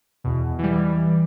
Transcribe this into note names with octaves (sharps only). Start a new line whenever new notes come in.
E2 B2
E3 G3